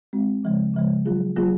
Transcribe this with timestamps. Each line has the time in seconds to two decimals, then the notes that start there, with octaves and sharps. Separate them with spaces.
0.13 G#3 C4 F#4
0.44 C#3 F3 G#3
0.74 C#3 F3 G#3
1.05 F#3 A#3 F4 G#4
1.36 F#3 A#3 F4 G#4